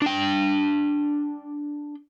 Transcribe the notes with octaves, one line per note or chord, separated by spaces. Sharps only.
D4 G5